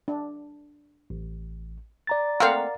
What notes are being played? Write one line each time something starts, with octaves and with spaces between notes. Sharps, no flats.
D4
A1
D5 A#5 A6
A3 A#3 C4 A#4 F5 F#5